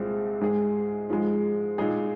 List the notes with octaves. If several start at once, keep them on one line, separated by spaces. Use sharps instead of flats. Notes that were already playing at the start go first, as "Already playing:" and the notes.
Already playing: C2 A#2 G#3 C4
G#2 G#3 D#4 G#4
G#2 F3 G#3
A#2 G#3 D#4 G#4